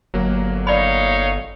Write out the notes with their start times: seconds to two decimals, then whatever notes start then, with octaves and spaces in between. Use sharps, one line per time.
0.14 G1 F#3 A#3
0.67 D#4 C#5 D5 F5 B5